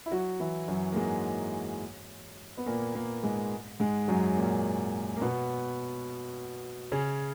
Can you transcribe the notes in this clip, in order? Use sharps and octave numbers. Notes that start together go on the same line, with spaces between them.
E4
F#3 F#4
E3 E4
F#2 F#3
A#3
G#2 G#3
B3
A#2 A#3
A#2 A#3
G#2 G#3
G#2 G#3
F#2 F#3
A#2 A#3
A#3
B2 B3
C#3 C#4